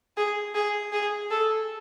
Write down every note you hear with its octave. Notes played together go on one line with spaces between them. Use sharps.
G#4
G#4
G#4
A4